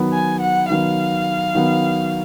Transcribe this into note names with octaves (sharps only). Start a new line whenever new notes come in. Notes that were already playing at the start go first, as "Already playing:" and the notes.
Already playing: D#3 F#3 B3
G#5
F#5
D#3 F#3 B3 F5
D#3 F#3 B3